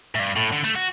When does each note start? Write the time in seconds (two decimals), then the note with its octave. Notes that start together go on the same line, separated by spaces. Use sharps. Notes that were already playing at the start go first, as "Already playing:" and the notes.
0.15 A2
0.19 G2
0.36 A2
0.52 D3
0.64 A3
0.75 F#4